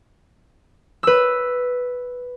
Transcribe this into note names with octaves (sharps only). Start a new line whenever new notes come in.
B4 E6